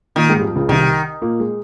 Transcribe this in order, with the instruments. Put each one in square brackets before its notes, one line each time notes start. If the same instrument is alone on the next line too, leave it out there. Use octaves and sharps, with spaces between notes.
[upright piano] A#2 A#3 [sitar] D#3
[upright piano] G#2 G#3
G3
F2 F3
C#2 C#3
[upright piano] C2 C3 [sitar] D#3
[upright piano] A#2 A#3
G#3